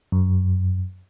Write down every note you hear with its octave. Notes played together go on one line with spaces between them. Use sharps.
F#2